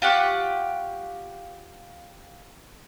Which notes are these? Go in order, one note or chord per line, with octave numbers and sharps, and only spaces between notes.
F4 G4 F#5 C#6